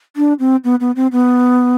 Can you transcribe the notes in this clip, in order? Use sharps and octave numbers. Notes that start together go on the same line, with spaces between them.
D4
C4
B3
B3
C4
B3